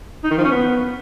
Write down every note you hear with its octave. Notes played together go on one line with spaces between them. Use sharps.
D#4
D#3
F3
C#4
B3